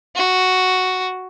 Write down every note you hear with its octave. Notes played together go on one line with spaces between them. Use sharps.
F#4